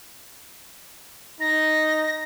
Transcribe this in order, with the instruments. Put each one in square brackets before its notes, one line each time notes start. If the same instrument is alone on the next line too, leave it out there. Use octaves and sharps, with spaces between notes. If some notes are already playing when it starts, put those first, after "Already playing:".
[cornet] D#4 [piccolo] A#6